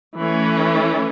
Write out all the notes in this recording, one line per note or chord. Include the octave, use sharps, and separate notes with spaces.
E3 A3 C#4